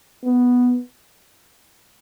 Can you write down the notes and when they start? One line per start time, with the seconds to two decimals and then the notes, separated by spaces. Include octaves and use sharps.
0.24 B3